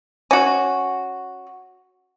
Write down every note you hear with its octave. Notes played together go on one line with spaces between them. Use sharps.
C#4 F#4